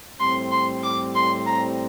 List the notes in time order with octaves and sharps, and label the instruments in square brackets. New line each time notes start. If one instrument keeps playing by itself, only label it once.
[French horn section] A2 G3 C4 [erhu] C6
[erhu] C6
D6
C6
A#5